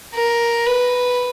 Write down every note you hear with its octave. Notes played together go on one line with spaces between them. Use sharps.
A#4
B4